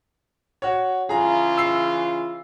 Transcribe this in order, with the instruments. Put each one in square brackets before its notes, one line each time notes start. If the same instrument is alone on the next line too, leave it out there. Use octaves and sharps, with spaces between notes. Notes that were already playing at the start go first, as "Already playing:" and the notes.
[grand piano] F#4 C#5
[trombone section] C#3 E3 F4 [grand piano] G#4 A#5
[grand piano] E6 C7